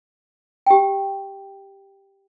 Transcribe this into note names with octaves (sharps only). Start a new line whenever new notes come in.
G4 G5